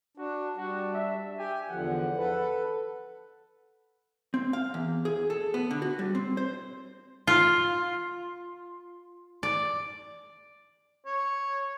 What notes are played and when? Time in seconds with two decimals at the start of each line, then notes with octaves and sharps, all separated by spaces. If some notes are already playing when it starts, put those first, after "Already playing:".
0.17 D4 F#4
0.57 G3 D4 F#4
0.94 E5
1.38 G4 G#5
1.70 E2 D3 F3 F#5
2.17 A4 B4
4.34 C4
4.53 F5
4.74 E2
5.05 G#4
5.30 A4
5.54 B3
5.71 D3
5.82 F#4
5.99 G3
6.15 C4
6.37 C5
7.27 F4
9.43 D5
11.06 C#5